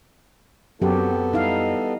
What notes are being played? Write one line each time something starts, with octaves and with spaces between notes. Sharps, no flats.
F#2 F#3 B3 C4 G4 A4
G3 D#4 E4 D#5 F5